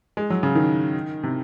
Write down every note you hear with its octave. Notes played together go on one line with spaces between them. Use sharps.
G#3
F#3
C#3
D#3
C3